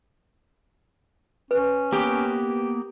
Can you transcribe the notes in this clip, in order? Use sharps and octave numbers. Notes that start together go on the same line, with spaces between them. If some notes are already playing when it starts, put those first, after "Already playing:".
C#4 B4
A#3 B3 G4